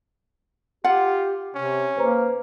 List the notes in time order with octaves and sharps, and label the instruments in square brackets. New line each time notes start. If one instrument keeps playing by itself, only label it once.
[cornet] F4 [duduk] G4 [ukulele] F#5
[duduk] C3 [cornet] C#4
[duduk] A#3 [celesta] B4 C5 A#5